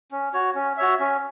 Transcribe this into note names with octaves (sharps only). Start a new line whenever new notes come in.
C#4
F#4 C#5
C#4
F#4 C#5 E5
C#4